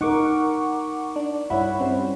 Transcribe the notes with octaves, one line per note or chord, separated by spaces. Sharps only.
D#4 A#4 F#5 C#6 D6
D4
G2 E4 C#5 F#5 B5
G3 C4 C#4